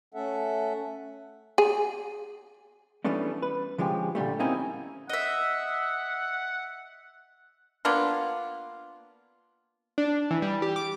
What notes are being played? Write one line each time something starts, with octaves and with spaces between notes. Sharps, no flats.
A3 C#4 A4 E5 F#5
G#4
E3 G3 A3 B3 C#4 D4
B4
D3 F3 G#3 C#4 G4
A#2 D3 G3 A3
A#3 C4 C#4 D#4 E4
D#5 E5 F#5
A#3 B3 D4 F4
D4
E3
G3
G4
D6